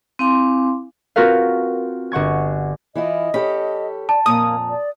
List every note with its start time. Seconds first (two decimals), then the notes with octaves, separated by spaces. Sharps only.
0.19 C4 E4 F5 G#5 C6 D6
1.16 C4 F4 F#4 A#4 B4 F5
2.12 G1 F#5 C#6 G#6
2.95 E3 E4 F4 D#5
3.34 C#4 G4 A4 B5
4.09 D5 A5
4.26 F2 A#2 A#3 A#5 D#6
4.69 D5